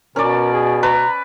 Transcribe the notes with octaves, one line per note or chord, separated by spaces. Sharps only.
B2 C#4 A#4 D5
G#4
B4 A#5